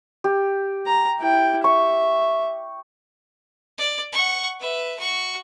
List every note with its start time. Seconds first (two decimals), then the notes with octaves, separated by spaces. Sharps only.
0.24 G4
0.87 A#5
1.20 E4 G5
1.64 E5 C#6
3.78 D5
4.13 F#5 C#6
4.60 B4 E5
4.99 F#4 C#6